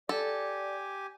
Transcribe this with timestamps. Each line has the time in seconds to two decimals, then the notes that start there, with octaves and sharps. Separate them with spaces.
0.09 G4 A4 D5 G#5